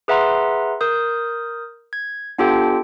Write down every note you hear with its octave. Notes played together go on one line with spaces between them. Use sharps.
G#4 B4 E5 F#5 A#5 C6
A#4 D#6 G6
G#6
B3 D4 F4 G4 A4 G5